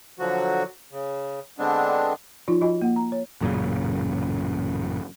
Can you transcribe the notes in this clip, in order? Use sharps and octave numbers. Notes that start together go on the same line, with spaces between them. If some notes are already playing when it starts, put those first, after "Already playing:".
D3 F3 F#3 F#4
C#3
D3 G#3 B3 C4 D4
F3 D#4 F4 D5
F3 F4 F#4 D#5 G#5 B5
A#3 F#5
A#5
C#5
A1 F#2 A#2 C#3